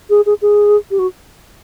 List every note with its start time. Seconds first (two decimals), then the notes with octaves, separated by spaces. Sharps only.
0.10 G#4
0.26 G#4
0.42 G#4
0.91 G4
0.99 F#4